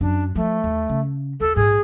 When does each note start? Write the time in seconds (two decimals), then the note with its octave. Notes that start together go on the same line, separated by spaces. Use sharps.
0.01 F#2 D4
0.35 F3 A3
0.64 D#2
0.89 C#3
1.40 D#2 A4
1.56 A#1 G#2 G#4